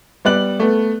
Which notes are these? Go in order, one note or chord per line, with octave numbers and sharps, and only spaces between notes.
G3 B3 D5 F#6 F#7
A3 B3